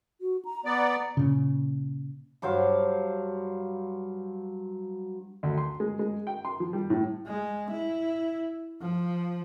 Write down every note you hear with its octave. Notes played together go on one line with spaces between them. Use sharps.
F#4
A#5
B3 D5 A#5
A#2 C#3
G2 F#3 C5 F5
D2
C6
G#3
G#3
G5
C6
F3
G3
A2
G#3
E4
F3